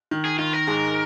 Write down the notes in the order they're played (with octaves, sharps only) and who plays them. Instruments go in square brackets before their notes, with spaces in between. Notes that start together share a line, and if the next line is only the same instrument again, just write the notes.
[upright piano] D#3
[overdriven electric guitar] G#4
[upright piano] D#3 [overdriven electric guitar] F4
[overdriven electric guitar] A#4
[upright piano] G#2 G#3